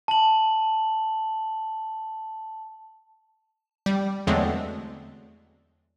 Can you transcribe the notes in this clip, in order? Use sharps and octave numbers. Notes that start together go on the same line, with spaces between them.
A5 F#7
G3
E2 D3 F#3 G#3 A3 C4